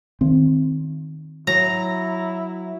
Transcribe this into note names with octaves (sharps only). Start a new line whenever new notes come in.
D#3 C4
F#3 E4 A#5